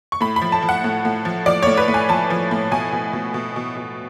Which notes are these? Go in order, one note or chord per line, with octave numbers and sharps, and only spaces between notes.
C#6
A2 B5
B5
F3
A5
F3
F#5
A2
A2
F3
F3 D5
A2 C#5
B4
A2
G#5
F3 A5
F3
A2
B2 G#5
B2
B2
B2
B2
B2